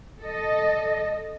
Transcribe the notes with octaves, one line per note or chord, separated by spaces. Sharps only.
A4 D#5